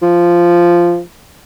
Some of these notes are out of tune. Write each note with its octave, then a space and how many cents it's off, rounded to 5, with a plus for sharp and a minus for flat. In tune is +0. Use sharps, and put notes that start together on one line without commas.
F3 -10